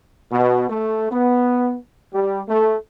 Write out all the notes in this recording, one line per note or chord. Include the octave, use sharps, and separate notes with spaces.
B2
A3
B3
G3
A3